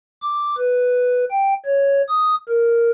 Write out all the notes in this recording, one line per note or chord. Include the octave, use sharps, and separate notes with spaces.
D6
B4
G5
C#5
D#6
A#4